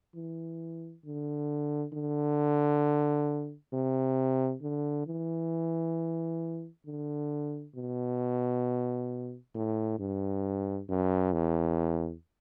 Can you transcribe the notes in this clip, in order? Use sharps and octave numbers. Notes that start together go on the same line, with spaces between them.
E3
D3
D3
C3
D3
E3
D3
B2
A2
G2
F#2
E2